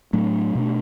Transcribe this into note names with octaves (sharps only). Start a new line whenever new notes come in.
A2 F#3 A3 D4
B2 A3 D4